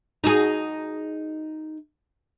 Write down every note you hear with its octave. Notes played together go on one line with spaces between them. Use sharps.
D#4 F#4 G#4